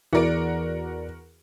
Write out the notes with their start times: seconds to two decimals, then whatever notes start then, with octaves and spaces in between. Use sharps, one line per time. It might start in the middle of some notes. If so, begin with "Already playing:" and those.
0.13 E2 E3 F#4 A#4 D5 D7